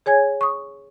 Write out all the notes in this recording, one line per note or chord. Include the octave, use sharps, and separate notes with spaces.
G#4 C#5 G#5 G#6
C#6 D#6